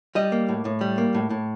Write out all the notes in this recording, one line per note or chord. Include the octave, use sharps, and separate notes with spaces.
G3 D#5
A#3
A2
A2
G3
A#3
A2
A2